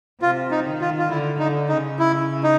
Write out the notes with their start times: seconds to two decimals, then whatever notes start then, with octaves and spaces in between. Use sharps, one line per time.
0.21 C3 F4
0.51 D#4
0.66 D#3
0.81 F4
0.98 F4
1.10 D3 E4
1.39 D3 D#4
1.69 C#3 D#4
1.99 E4
2.43 D#4